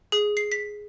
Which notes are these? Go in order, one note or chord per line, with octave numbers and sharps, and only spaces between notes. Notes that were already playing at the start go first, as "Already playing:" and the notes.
G#4
C7
B6